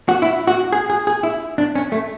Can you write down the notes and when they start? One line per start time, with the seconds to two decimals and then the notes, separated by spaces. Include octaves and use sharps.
0.09 F#4
0.22 E4
0.47 F#4
0.72 G#4
0.90 G#4
1.07 G#4
1.23 E4
1.58 D4
1.75 C#4
1.92 A3